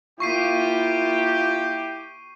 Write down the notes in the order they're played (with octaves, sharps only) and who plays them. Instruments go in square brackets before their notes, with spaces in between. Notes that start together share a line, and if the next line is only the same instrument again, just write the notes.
[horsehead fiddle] A#3 F4 [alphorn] E4 [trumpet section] G4 [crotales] C#6 C7 D#7